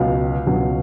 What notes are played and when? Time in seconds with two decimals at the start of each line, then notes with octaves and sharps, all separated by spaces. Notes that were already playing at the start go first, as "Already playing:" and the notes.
Already playing: C#2 B2 F#3 F5
0.47 C#2 B2 F#3